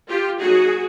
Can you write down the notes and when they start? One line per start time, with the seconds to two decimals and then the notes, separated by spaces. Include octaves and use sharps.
0.08 F4 G4
0.39 F#3 A#3 D#4 F#4 G#4